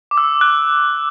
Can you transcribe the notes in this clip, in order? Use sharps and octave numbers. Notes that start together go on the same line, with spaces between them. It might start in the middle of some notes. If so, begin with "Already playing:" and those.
D6
E6
F#6